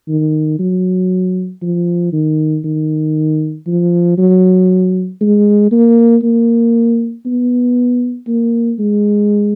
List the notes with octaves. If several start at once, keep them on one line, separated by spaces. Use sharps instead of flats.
D#3
F#3
F3
D#3
D#3
F3
F#3
G#3
A#3
A#3
B3
A#3
G#3